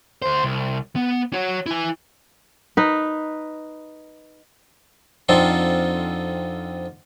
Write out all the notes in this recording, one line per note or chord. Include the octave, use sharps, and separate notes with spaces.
D2 C5
C2
B3
F#4 C#5
E4 G#5
D#4 B4
F2 D3 C4 D#4 F4 A4